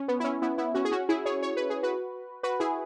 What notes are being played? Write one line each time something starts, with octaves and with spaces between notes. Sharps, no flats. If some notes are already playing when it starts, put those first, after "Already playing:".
Already playing: C#4
B3
E4
C#4
B3 E4
B3 E4
C#4 F#4
G#4
C#4 F#4
E4 G#4
G#4 C#5
C#5
B4
G#4
F#4 B4
F#4 B4
E4 G#4